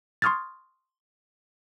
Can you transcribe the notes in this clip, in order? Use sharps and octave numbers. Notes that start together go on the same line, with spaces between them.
C6 C#6 D#6 F6 G#6 A6